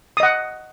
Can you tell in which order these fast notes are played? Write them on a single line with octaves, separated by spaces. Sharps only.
D#6 D#5 F#5